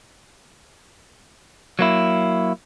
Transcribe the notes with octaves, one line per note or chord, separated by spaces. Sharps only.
F#3 A#3 E4